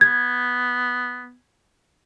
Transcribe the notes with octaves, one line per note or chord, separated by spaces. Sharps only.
B3 G#6